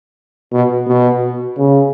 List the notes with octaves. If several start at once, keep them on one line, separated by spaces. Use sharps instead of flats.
B2
B2
C#3